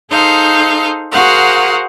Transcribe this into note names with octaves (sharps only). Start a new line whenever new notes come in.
D#4 G#4 A4 C5 F5 G6
F#4 G#4 A#4 C5 F5 F#5